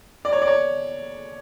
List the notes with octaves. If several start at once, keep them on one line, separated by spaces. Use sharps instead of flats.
D5
C#5
D5
C#5